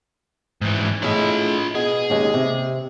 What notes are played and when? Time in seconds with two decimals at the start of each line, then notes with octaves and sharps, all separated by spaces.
0.62 G#2 E3
1.03 A2 F4 G#4 D#5 B5
1.75 B2 G#4
2.10 D#2 C#3 G#3
2.34 C3